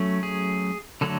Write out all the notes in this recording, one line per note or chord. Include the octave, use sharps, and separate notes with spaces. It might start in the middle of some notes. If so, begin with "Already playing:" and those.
Already playing: F#3 A3 C#4
G#4
D3 F#3 A3 A4